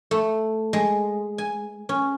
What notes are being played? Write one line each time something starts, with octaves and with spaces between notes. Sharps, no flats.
A3
G#3
G#5
C#4